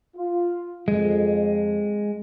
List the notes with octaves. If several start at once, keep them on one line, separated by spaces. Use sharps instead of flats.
F4
F2 G#3